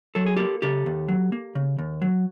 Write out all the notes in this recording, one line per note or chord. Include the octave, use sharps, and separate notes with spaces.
F#3 A4
G#4
A#3 G4 A4
C#3 G4 A4
D#2
F#3
A#3
C#3
D#2
F#3